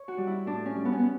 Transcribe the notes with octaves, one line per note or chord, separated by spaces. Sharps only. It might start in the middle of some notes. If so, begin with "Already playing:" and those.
Already playing: C#5
F#4
G3
E4
A2 D4
C#4
G3
B3
C#4
B3